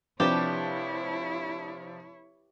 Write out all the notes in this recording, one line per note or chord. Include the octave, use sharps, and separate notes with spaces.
C3 F3 D4 E4 G4 B4 C#5 A5